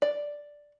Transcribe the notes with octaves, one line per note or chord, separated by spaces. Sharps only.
D5